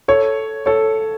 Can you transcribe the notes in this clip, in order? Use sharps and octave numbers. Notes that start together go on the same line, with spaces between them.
A4 C#5
A4 C#5